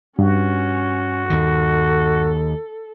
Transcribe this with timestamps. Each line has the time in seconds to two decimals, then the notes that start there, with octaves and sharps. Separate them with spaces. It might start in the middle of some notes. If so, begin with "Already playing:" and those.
0.19 G2 C#4 F#4
1.30 D#2 D#3 A4